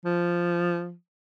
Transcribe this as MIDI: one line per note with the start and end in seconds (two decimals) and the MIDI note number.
0.05 0.93 53